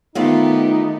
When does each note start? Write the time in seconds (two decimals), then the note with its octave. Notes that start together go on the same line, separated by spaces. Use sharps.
0.15 D#3 A3 B3 D#4 F4 G4